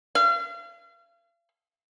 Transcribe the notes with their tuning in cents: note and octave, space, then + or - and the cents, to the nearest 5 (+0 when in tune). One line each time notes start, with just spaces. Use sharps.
F5 -40